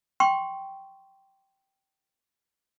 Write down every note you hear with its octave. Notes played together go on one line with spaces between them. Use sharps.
G5 C6 C#6